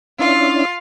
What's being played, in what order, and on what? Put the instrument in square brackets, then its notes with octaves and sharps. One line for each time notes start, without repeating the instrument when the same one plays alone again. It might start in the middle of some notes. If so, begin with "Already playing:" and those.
[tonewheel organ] C#4 D4 E4 [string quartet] F4 F5